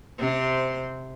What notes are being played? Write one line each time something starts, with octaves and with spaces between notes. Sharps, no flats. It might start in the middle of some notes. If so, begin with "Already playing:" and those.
C3 C5